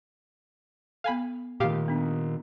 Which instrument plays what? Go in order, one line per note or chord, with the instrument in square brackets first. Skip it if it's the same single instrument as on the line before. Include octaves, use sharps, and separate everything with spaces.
[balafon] B3 A4 [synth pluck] F5 G#5 B5
[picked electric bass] A#2 D#3 [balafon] A3 [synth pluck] G4 F5
[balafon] B3 D4